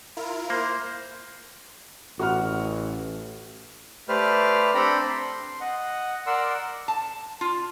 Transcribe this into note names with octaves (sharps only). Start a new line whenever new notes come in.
E4 F4 A#4
A#3 C5
A1 F#4 F#5 F6
A3 G4 B4 C5 D5 F6
C4 D4 A4 G5 A#5 B5
C6
D#5 F#5
A#4 D5 F#5 C6 E6
A5
F4